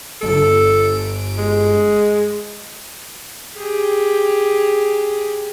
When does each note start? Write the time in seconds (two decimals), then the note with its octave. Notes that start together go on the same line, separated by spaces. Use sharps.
0.21 G1 A4 D7
1.39 G#3
3.56 G4 G#4